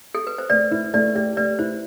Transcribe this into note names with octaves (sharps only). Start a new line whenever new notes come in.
A4
B4
C5
A3 B4 D5
E4 B4
A3 B4 D5
G4 B4 D5
A3 B4 D5
E4 C5